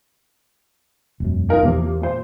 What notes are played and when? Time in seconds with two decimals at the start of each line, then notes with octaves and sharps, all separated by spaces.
1.20 E1 F#2
1.49 D#4 F4 A#4
1.63 E2 C3 D#3 F3 A#3
2.01 A#2 C5